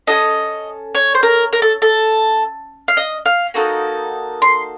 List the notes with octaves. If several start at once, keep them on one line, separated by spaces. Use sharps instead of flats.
C#4 F#4 A4 D#5
C#5
C5
A#4
A#4
A4
A4
F5
D#5
F5
A#3 D#4 F#4 A4
C6